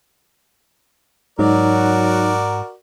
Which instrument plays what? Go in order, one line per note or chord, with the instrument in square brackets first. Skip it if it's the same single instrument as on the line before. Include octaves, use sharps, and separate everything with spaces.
[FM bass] G#2 [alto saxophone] F#3 [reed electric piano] D#4 [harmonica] F#4 A#4 D5